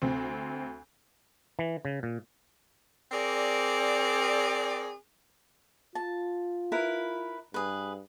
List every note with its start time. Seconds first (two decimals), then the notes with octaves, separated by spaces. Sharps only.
0.02 D2 C4
1.59 E3
1.85 C#3
2.03 A#2
3.12 C4 G#4 A#4 D5
5.95 F4 A5
6.72 E4 A#4 B4
7.54 G2 G#4 B4